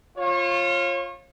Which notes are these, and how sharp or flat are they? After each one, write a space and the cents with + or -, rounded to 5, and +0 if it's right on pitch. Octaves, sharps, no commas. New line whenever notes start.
F4 +0 C#5 -35